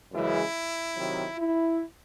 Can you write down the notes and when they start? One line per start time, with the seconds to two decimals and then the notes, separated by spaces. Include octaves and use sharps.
0.12 F#2 C#3 E3 G#3 E4
0.96 C3 D#3 F#3
1.38 E4